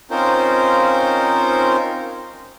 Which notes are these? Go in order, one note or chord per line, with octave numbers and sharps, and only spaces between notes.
C4 C#4 D#4 F4 A#4 C5